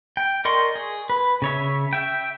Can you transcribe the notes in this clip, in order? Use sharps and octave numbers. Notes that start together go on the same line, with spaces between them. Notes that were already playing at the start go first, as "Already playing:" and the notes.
G5
A#4 D5 D#5 C6 C#6
G#4
B4
C#3 C#5 E5
E5 G5